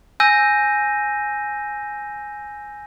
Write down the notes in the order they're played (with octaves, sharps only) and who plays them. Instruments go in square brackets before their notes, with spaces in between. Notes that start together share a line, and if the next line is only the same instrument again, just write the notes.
[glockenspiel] G#5 E6 G6 A#6 D#7